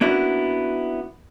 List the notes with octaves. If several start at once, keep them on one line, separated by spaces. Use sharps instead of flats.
A#3 B3 C#4 D4 E4 F#4